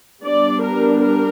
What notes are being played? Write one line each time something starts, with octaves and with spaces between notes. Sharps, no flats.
G3 B3 D4 D5
A#4
A#4